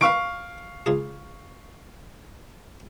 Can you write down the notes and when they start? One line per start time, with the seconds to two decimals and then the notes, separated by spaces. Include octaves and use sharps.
0.01 D#3 B4 F5 C#6 D7
0.86 C#2 F4 G#4